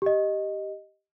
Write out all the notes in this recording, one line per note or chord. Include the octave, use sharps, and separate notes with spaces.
G4 D#5